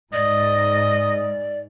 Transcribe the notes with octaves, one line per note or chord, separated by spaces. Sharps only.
G#2 D5 D#5